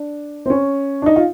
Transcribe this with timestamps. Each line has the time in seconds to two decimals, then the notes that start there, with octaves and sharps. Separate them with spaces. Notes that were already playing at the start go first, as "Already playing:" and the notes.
Already playing: D4
0.46 C4
0.50 C#4
1.02 D4
1.06 D#4
1.16 F4